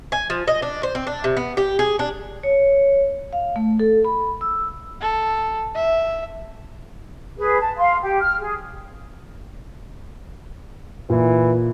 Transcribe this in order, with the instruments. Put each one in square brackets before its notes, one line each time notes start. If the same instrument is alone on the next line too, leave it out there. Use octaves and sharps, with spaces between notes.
[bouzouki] G#5
F3
D#5
D4
C5
C4
D4
C3
B3
G4
G#4
D4
[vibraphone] C#5
F5
A3
A4
B5
E6
[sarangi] A4
E5
[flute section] G#4 B4
A5
F5 C6
G4
F6
G#4
[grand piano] A#2 [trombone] E3